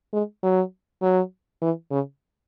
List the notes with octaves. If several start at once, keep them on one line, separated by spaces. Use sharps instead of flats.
G#3
F#3
F#3
E3
C#3